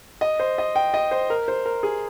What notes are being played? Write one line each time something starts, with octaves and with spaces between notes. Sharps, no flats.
D#5
C5
D#5
G5
D#5
C5
A#4
C5
A#4
G#4